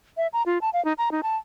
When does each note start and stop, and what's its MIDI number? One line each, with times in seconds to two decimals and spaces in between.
0.17 0.27 76
0.33 0.43 82
0.46 0.58 65
0.61 0.70 81
0.73 0.83 77
0.85 0.93 63
0.98 1.11 82
1.12 1.21 63
1.23 1.37 81